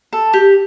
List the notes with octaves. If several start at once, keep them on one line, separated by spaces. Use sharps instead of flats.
A4
G4